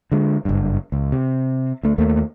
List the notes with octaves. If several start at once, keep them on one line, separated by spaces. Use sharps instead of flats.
D3 G#3
F#1 G2
C#2
C3
D2 A3
D#2 A3 A#3